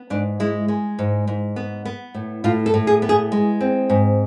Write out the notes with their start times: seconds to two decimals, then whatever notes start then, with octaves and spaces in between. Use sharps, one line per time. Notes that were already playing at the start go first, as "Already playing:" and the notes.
Already playing: B3
0.10 G#2 D4
0.40 G#3 E4
0.68 G#3
0.99 G#2
1.27 G#2
1.56 B3
1.85 B3
2.14 A2
2.44 A2 F4
2.66 A4
2.74 A2
2.87 G#4
3.02 B3
3.09 G#4
3.32 G#3
3.61 C4
3.90 G#2